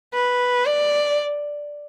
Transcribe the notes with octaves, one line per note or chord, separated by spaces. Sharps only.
B4
D5